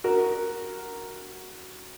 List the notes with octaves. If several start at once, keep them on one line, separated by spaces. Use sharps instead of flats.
F#4 A#4